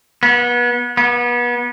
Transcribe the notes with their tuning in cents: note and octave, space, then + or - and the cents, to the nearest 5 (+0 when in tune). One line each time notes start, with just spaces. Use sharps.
B3 -30
B3 -30